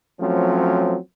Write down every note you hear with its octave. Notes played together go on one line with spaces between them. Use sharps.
F3 F#3 A3 C4 C#4